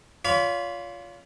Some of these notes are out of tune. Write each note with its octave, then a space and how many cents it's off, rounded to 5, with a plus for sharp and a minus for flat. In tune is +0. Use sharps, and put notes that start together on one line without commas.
F4 +0 C#5 +45 B5 +0